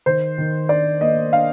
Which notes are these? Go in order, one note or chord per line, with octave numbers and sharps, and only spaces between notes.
D#3 C5
D#3
D4 D5
A#3 D#5
D4 F5